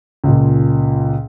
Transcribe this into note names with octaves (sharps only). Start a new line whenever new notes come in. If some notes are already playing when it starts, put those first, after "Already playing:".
C#2 A#2